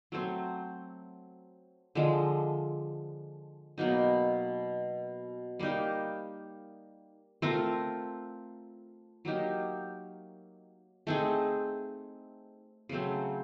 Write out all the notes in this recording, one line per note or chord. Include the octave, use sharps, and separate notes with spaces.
F#3 A3 C4
D3 F3 G#3
B2 F#3 A#3 D#4
G3 A#3 D#4 G4
A3 C4 F4 A#4
F#3 A#3 D#4 G4
A3 C4 D#4 G#4
C#3 F#3 A3 C4